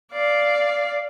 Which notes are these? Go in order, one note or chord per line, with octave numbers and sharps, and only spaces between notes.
D5 F5